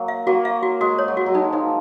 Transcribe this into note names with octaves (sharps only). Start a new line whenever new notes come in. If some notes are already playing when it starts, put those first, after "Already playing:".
Already playing: F#3 A#3
F5
F#3 A#3 F#4
F5
F#4
G#3 F#4
C#5
F#3
F#4
F#3
G#3 D#4
F3 D#4